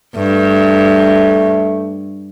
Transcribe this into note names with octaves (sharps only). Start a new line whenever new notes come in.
G2 A3